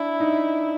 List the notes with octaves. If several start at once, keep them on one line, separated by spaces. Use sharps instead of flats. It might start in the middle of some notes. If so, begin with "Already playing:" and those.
Already playing: D4 E4
D#4